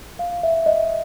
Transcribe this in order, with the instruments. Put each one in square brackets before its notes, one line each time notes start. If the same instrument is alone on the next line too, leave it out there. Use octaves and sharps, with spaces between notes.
[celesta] F5
E5
D#5